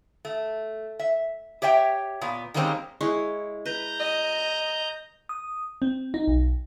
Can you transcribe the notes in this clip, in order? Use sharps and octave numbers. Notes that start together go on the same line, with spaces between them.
A3
E5
G4 C#5 E5 G5
A#2 B3
D#3 G3 G#3 A#3 C4 C#4
G#3 E4 C#5
B4 A#5 G6
D#5
D#6
C4
D#4
B1